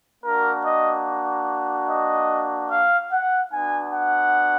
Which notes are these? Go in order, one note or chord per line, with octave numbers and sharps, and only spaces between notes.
A#3 D4 F#4 A#4
D#5
D#5
F5
F#5
B3 D4 F#4 G#5
F#5